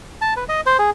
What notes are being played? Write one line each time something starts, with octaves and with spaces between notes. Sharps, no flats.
A5
B4
D#5
C5
G#4